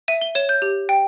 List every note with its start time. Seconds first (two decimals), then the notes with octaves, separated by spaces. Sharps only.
0.08 E5 D#7
0.21 G7
0.35 C#5 E7
0.49 G6
0.62 G4
0.89 G5